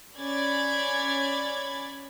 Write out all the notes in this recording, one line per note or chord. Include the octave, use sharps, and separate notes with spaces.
C#4 D5 B5 G#6 A6